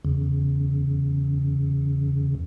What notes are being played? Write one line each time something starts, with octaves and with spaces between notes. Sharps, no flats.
E2 C#3